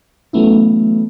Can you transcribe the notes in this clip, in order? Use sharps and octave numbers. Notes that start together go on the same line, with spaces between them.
E3 F#3 A3 B3 C#4 E4